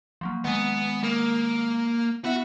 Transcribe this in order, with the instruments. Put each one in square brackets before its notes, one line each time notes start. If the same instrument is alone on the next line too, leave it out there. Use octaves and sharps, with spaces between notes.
[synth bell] F3 F#3 A#3
[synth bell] D#3 G#3 [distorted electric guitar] B3
[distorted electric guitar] A#3
[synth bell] B3 E4 E5 [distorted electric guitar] F#4